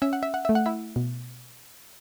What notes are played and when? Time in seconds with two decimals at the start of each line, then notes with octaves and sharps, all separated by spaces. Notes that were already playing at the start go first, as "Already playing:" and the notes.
0.02 C#4 E5
0.13 F#5
0.23 E5
0.34 F#5
0.45 A3 E5
0.55 F#5
0.66 E4 E5
0.96 B2